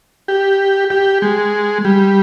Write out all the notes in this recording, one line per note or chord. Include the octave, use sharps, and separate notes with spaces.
G4
G4
G#3
G3